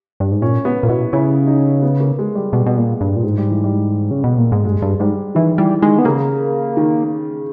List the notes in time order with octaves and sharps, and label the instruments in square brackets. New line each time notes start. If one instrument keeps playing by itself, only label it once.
[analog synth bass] G2
G#2
[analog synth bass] A#2 [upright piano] C#4
[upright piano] B3
[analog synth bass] A#2
[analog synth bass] B2 [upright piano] E4
[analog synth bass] C#3 [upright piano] E4
[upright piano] D#4
B3
A#3
G#3
G3
[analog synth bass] B2 [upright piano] G3
[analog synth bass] B2
A#2
G2
A#2
[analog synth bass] G#2 [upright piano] G#3
[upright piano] G3
E3
G3
[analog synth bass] C#3
B2
A#2
G#2
[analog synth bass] G2 [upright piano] G#3
[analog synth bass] G2
[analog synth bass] G#2 [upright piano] G3
[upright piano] D#3 [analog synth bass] E3
[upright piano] E3 [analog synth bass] G3
[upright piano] D#3 [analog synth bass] G#3
[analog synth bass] B3
[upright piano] C#3 [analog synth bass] A#3
[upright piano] D#3